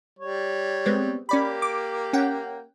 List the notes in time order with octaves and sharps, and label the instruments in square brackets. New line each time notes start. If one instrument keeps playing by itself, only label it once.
[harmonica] G3 C#5
[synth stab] G#3 B3 C4
[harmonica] A#3 G4 [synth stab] C#4 D5 B5
[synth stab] D6
C#4 F#5 G5